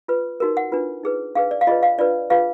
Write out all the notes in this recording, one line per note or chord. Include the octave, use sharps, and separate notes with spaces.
F4 B4
D#4 F#4 A#4
F#5
D4 F4 B4
D#4 G#4 B4
D4 G#4 B4 F5
D5
F5
F4 G#4 B4 D#5
F5
D4 F4 B4 D5
F4 G#4 B4 F5